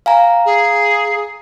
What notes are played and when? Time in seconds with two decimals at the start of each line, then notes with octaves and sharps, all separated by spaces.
0.06 F5 G#5 A#5
0.46 G#4